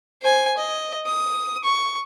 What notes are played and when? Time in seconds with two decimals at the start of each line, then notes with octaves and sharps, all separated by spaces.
0.22 C5 G#5
0.57 D#5
1.06 D#6
1.64 C#6